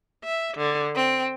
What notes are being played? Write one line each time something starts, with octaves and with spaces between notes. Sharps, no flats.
E5
D3
C4